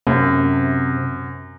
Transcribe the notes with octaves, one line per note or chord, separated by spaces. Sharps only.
F#2 C3